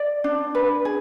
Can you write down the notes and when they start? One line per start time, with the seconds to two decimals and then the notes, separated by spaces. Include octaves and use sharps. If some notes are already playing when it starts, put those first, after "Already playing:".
Already playing: D5
0.24 D4
0.55 B4
0.85 G#4